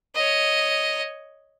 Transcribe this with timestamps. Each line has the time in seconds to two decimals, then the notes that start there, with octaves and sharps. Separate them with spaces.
0.15 C#5 D#5